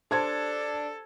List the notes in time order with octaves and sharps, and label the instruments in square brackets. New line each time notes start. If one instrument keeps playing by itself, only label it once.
[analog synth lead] D4 [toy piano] G4 C5 C6 [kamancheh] A4 [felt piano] A5 G#6